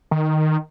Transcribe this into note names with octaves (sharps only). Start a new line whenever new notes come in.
D#3